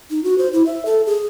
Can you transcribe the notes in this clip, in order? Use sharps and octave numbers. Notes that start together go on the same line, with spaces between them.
D#4
F#4
C5
E4
E5
A4
G#4